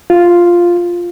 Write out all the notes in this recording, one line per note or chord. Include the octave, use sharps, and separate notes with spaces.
F4